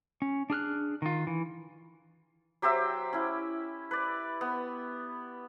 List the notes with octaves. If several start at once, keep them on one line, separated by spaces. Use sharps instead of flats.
C#4
D4 G#4 F6 F#6
D#3 F4
E3
F#3 G4 C5 E5
C#4 E4
B4 D5
B3